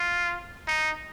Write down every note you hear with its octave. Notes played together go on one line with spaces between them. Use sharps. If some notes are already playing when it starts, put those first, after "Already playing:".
Already playing: F4
D#4